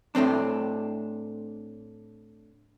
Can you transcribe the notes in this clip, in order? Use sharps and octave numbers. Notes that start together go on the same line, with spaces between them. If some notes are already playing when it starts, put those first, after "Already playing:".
A2 A3 C4 D4